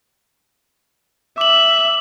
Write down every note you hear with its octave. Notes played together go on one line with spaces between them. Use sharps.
E5 D6 F#7